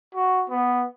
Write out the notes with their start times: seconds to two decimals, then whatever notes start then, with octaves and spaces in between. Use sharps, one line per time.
0.15 F#4
0.50 B3